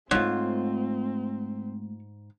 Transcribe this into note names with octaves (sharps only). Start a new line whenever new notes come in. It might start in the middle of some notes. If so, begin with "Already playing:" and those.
G#2 G#3 A3 C4 F4 C#5